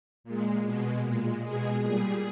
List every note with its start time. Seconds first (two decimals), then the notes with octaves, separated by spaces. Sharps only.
0.24 A#2 G#3
0.64 B2 G#3
1.03 A#2 G#3
1.43 B2 G#3 G#4
1.83 A#2 G3 G#4